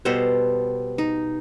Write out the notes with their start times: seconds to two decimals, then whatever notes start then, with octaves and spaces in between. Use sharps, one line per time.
0.05 B2 G3 A4 C5
0.98 D#4